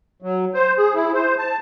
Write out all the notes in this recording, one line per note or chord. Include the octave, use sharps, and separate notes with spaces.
F#3
C5
G#4
E4
C5
A5